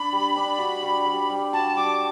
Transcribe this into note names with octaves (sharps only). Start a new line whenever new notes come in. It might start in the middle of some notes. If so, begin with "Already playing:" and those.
Already playing: D4 B5
G3
D4
F#4
G3
G3
G3
F#4 A5
G3 D6